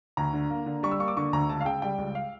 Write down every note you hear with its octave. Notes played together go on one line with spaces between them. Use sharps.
D2 A#5
D3
A#3
D3
G3 C#6
E6
A#3 C#6
D6
D3 C#6
D2 A#5
C#2 A5
F5
C#3 G5
G3 G5
C#2
F5